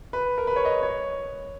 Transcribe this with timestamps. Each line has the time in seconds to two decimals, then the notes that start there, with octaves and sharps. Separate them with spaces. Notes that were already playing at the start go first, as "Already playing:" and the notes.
0.13 B4
0.38 A#4
0.47 B4
0.56 C#5
0.65 D#5
0.82 C#5